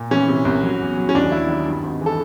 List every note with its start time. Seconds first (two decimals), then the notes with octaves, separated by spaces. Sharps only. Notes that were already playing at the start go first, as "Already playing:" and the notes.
Already playing: A#2
0.11 E3 C#4
0.28 C3
0.45 C2
0.63 F#3
0.80 E2
0.97 F#3
1.09 C#4
1.15 D#2 D4
1.31 F#3 E4
1.48 D#3
1.66 G2
1.84 G#1
2.01 E3
2.06 A4